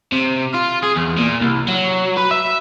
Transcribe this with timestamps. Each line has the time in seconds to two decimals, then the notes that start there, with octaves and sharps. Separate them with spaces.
0.12 C3
0.54 F4
0.83 G#4
0.96 E2
1.17 A#2
1.41 C2
1.68 F#3
2.17 B4
2.31 E5